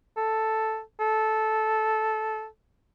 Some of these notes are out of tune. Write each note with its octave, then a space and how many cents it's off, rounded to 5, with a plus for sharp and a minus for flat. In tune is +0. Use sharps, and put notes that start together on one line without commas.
A4 +0
A4 -10